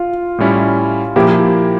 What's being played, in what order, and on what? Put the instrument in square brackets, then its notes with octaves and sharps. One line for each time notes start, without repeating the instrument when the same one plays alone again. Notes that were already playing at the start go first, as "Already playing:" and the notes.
Already playing: [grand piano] F4
[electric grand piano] A2 G3 C#4 E4
[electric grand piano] A#2 F3 A#3 E4 [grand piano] G4